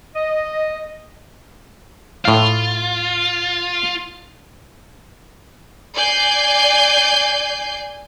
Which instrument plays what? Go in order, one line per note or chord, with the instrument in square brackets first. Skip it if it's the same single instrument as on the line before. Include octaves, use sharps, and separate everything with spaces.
[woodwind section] D#5
[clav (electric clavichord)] A2 F5 [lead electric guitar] F4
[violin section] D5 G#5 G6 C7